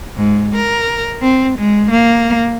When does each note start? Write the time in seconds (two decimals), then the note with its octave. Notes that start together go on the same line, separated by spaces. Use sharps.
0.17 G#2
0.55 A#4
1.22 C4
1.58 G#3
1.90 A#3